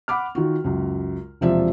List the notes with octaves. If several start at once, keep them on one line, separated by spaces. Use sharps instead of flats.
F#5 B5 D6 F6
D#3 F4 F#4
C#2 F#2
E1 C3 F3 D5 E5